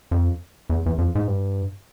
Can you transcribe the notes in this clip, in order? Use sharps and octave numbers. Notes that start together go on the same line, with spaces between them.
F2
E2
E2
F2
G#2
G2